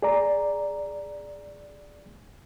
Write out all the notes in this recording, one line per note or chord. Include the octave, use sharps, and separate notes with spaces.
G#4 D5 A#5